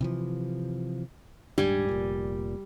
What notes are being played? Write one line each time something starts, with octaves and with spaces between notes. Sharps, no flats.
C3 E3 F3
D#1 G#2 G3 D4 G#5
F1 A#2